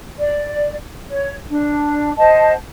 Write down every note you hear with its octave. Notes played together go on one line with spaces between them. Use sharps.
D5
C#5
D4
C5 D#5 F#5 A5